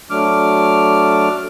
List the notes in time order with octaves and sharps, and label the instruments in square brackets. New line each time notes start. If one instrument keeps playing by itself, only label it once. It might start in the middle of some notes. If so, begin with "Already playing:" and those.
[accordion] F#3 A3 D4 D6 F6